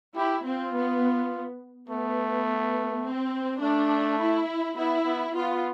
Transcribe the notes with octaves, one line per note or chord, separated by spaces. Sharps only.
E4 G4
C4 F4
B3
A3 B3
C4
A3 D4
E4
B3 E4
B3
B3 F4